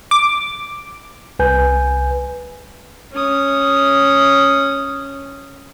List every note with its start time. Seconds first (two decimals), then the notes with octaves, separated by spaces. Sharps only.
0.11 D6
1.39 C2 B4 G#5 G6
3.12 C#4 D#6